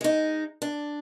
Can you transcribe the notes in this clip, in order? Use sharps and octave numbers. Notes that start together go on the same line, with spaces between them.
G#3 D#4
D4